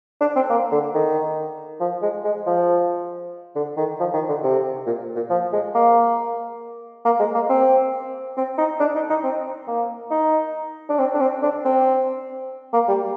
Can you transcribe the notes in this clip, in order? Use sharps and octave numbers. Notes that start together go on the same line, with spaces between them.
D4
C4
A#3
D3
D#3
F3
G#3
G#3
F3
D3
D#3
F3
D#3
D3
C3
A#2
A#2
F3
G#3
A#3
A#3
G#3
A#3
C4
C4
D#4
D4
D#4
D#4
C4
A#3
D#4
D4
C4
D4
C4
D4
C4
A#3
G3